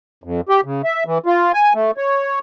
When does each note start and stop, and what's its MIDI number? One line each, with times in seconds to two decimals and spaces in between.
0.24 0.41 41
0.49 0.61 67
0.64 0.82 49
0.84 1.04 76
1.06 1.18 52
1.26 1.52 65
1.53 1.73 80
1.74 1.91 57
1.97 2.39 73